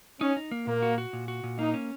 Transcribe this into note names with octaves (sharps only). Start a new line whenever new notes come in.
C#4 D#4
D#4
A#3
A#2 A#3
F#4
F#4
A#2
F#4
A#2
A#3 D#4
C#4